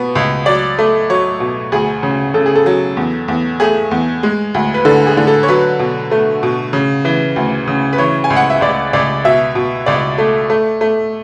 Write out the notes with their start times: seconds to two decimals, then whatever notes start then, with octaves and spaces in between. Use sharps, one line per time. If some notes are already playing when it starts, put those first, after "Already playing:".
Already playing: B2 B3
0.15 C#2
0.46 F#3 D5
0.79 A3
1.10 F#3 C#5
1.40 B2
1.72 D2 G#4
2.03 C#3
2.34 C#3 A4
2.46 G#4
2.56 A4
2.66 F#3
2.97 E2
3.28 E2
3.60 A3 G#4
3.91 E2
4.23 G#3
4.54 D2
4.74 B4
4.85 D3 A4
5.07 G#4
5.17 D3
5.27 A4
5.43 C#5
5.48 F#3 B4
5.79 B2
6.11 A3
6.43 B2
6.73 C#3
7.05 E3
7.36 D2
7.67 C#3
7.93 B4
7.98 E3 C#5
8.24 G#5
8.30 C#2
8.36 F#5
8.50 E5
8.61 C#2 D5
8.93 C#2 D5
9.25 B2 E5
9.55 B2
9.86 C#2 D5
10.18 A3
10.50 A3
10.81 A3